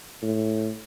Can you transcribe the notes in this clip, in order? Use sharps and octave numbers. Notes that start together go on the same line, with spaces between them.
A2